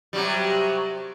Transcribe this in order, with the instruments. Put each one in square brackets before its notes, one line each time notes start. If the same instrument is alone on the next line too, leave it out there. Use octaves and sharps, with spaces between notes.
[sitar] C3 F#3 G3